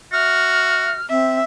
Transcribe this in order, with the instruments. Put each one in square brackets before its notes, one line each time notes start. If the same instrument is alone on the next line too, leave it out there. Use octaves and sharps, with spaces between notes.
[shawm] F#4 [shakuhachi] E5 [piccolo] F6
[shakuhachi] C4 [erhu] E5